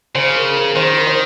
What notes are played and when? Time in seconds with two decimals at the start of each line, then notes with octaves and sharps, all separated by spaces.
0.15 C#3 C5
0.36 A#4
0.56 A#4
0.76 D#3 C5
0.97 A#4
1.07 C5